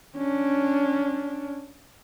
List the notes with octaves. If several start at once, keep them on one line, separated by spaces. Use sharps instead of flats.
C#4 D4